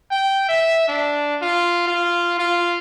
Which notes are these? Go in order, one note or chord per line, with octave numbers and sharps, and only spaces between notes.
G5
E5
D4
F4
F4
F4